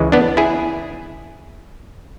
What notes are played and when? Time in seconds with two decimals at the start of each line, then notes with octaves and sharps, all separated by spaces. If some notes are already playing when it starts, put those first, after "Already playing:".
Already playing: C#2 C#3 E3 G#3
0.12 B3 D4
0.37 E4 G#4